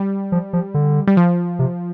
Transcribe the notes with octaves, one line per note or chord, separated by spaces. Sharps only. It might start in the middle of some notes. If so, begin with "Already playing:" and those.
Already playing: G3
F3
F3
D3
G3
F3
C3